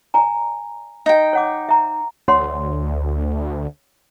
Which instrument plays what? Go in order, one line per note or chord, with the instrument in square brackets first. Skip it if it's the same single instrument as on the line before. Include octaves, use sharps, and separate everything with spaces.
[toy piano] D5 G#5 A#5
[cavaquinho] D#4 G5
[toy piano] C#5 F#5 D6
E5 A#5
[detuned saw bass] D2 [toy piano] C#5 F#5 C6